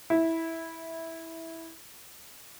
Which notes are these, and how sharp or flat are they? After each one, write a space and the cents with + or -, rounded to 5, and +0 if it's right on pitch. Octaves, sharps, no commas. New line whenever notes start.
E4 -10